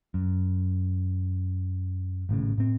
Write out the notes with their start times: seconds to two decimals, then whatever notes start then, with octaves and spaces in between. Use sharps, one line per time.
0.14 F#2
2.29 G#1 A2 C#3
2.58 A2 C4